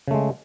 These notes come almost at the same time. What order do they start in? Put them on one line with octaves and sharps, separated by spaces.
C#3 A3 G#3